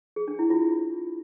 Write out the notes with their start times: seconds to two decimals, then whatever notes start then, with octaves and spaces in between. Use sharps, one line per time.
0.16 G#4
0.28 D4
0.39 E4
0.50 F4